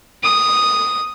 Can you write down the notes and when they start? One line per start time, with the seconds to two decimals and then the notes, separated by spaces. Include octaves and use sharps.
0.23 D#6